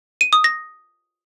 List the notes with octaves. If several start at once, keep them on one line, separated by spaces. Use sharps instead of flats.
D#7
D#6
A#6